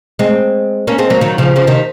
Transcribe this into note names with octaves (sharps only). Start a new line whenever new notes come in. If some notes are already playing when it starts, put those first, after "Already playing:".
G#3 C4
A#3 C#4
G#3 C4
F#3 A#3
D#3 F#3
C#3 F3
C#3 F3
C3 D#3